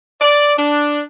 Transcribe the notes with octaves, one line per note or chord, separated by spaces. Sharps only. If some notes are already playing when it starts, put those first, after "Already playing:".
D5
D4